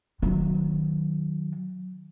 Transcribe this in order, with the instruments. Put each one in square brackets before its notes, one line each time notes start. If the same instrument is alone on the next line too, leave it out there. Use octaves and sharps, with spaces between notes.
[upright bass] D#3 F#3